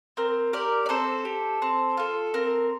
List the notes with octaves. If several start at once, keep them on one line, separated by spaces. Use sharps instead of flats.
C4 A#4
G4 A#4 D5
D5
C4 A4 C5
G4
C4
F4 A4
C4 A#4